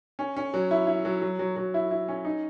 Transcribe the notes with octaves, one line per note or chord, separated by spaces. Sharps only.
C#4
C#4
F#3
E4
E4
F#3
F#3
F#3
F#3
E4
E4
C#4
D#4